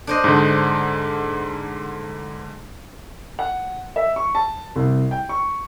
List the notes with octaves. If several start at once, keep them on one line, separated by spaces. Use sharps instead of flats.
D4 C5 D#5
G#2 D3
F#5
E5
C#6
A5
C2
G5
C#6